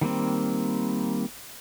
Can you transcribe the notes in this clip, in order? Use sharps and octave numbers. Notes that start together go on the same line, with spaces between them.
D#3 G3 A#3 C4